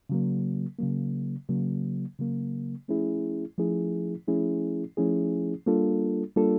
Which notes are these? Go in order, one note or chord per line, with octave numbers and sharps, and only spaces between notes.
C#3 F#3 A#3
C#3 F#3 A#3
C#3 F#3 A#3
C#3 F#3 A#3
F3 A3 C#4 E4 G#4
F3 A3 C#4 E4 G#4
F3 A3 C#4 E4 G#4
F3 A3 C#4 E4 G#4
G3 A#3 D4 F4 A4
G3 A#3 D4 F4 A4